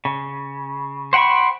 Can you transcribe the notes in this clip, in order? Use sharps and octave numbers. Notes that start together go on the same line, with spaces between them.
C#3
C5 F#5 G5 B5 C#6